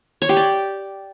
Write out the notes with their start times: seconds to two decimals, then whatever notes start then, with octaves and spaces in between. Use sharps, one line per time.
0.22 C#5
0.29 G4
0.37 D5